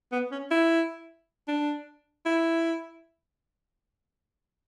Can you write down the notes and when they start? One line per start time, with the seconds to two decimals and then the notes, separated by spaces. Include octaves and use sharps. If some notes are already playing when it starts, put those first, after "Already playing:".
0.12 B3
0.31 C#4
0.51 E4
1.48 D4
2.26 E4